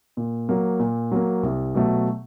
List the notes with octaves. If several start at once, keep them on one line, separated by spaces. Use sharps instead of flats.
A#2
F#3 A#3
A#2
F#3 A#3
C2
B2 F#3 A3